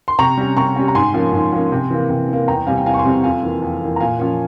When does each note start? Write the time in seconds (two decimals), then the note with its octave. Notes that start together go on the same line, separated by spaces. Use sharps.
0.08 C6
0.19 C3 A#5 C#6
0.37 G3 C#4
0.57 C3 A#5 C#6
0.76 G3 C#4
0.88 A#5
0.95 G#2 G#5 C6
1.14 F3 A#3 C#4
1.33 G#2
1.52 F3 A#3 C#4
1.72 C3
1.91 E3 A#3
2.10 C3
2.29 E3 A#3
2.48 E2 G5 A#5
2.67 C3 G3 C4 F5 G#5
2.78 G5
2.86 E2 F5 G#5
2.94 C#6
2.99 G#5 C6
3.05 C3 G3 C4
3.24 F2 F5 G#5
3.43 E3 A#3
3.62 F2
3.81 E3 A#3
3.96 A#5
4.00 A#2 F5 G#5
4.19 F3 A#3 C#4